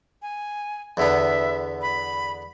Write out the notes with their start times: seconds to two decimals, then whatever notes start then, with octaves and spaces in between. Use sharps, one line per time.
0.22 G#5
0.97 E2 D3 B3 E5
1.82 B5